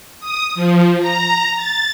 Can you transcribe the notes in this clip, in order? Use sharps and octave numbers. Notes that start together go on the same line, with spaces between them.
D#6
F3
A#5
A6